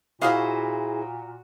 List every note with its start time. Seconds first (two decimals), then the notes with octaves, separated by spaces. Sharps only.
0.21 A#2 E4 F#4 G#4 C5 D#5 F5